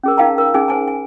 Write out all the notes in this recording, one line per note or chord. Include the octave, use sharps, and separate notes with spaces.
C#4 G#4 A#4
D#4 A#4 F5 G5 A5 A#5
A#4
C#4 D#4 G#4 G#5
C5 G#5 A5
G#5